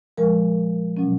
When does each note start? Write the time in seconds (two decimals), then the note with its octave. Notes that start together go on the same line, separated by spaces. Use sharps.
0.18 A#2 F3 G#3 A#4
0.97 B2 F#3 C#4